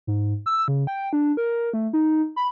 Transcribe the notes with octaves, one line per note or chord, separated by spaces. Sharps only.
G#2
E6
C#3
G5
D4
A#4
A3
D#4
B5